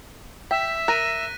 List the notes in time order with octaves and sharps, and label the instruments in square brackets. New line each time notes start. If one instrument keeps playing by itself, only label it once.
[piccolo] E5 [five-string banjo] G5 [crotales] B6
[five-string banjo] A#4 [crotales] F#6 A#6 D#7